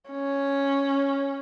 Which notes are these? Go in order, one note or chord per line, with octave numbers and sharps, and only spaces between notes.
C#4